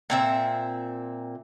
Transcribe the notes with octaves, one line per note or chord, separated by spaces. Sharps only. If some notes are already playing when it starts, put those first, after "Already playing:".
A#2 C4 E5